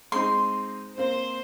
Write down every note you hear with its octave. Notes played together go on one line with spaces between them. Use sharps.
G#3 C4 D#4 C6
A#3 C4 C5